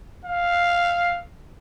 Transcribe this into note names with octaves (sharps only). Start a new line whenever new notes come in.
F5